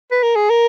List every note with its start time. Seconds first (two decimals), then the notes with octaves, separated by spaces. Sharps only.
0.11 B4
0.23 A#4
0.36 G#4
0.50 A#4